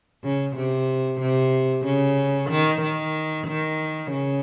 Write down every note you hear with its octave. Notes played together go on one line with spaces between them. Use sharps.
C#3
C3
C3
C#3
D#3
D#3
D#3
C#3